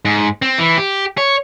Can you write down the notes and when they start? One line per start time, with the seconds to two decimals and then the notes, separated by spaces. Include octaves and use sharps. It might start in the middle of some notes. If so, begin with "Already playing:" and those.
0.05 G#2
0.42 C4
0.59 E3
0.77 G4
1.18 C#5